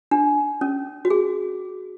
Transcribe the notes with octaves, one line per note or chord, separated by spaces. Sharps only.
D4
C#4
F#4
G#4